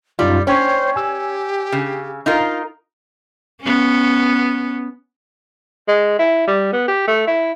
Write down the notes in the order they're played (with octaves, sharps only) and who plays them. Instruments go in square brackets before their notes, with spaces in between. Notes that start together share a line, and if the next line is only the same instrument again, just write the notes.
[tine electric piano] F#2 D#4 F4 [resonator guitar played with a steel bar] G3 [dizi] D5
[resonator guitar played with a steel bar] C#4 [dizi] C5 [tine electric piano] C#5 G5 C#6
[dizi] G4 [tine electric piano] G#5 E6
[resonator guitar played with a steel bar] C#3
[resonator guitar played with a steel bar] D#4 F4 A#4 [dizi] F5
[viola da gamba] B3 C#4
[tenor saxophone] G#3
E4
G3
B3
G4
A3
E4